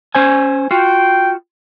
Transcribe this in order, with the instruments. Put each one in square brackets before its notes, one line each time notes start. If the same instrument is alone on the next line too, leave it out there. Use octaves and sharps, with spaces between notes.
[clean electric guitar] C#4 C5 G#5
[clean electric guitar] F4 F#4 [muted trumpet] G5